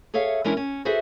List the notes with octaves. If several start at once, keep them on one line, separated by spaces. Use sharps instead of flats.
G#4 A4 C#5 E5 F5
E3 G#3 C#4 D4 E4 A#4
C#4
F#4 G#4 A4 B4 C5 E5